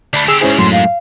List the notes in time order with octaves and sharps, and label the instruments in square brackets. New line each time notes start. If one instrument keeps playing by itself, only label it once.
[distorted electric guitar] D2 A3 [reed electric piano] D5 B5
[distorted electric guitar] D3 G4 [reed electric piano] G#4 [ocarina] E6
[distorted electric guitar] D2 G#2 [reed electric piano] C#4 E4 G#4 [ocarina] C5
[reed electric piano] F#2 A2 F#3 [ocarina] C6
[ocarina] F5